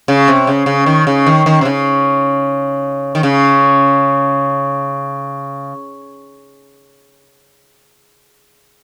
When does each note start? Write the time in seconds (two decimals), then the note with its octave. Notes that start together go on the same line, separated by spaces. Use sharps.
0.08 C#3
0.28 C3
0.47 C#3
0.66 C#3
0.86 D#3
1.07 C#3
1.26 D#3
1.46 D#3
1.61 C3
1.65 C#3
3.15 D#3
3.23 C#3